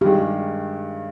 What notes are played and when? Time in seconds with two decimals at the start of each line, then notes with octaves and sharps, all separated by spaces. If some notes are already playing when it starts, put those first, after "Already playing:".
0.01 G2 D#3 G#3 G4